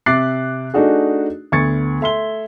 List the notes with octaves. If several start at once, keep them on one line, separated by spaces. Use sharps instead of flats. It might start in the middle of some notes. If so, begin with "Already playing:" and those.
C3 E5 D6 F#6 A6 C7
A3 D4 D#4 F#4 G#4
D2 B3 C#6 G#6 A6 C#7
A3 E5 C6 G7